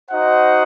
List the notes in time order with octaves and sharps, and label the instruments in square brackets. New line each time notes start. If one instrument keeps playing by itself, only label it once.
[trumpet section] D#4 F#4 C5 D#5 F#5